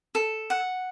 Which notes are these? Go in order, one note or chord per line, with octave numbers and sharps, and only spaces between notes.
A4
F#5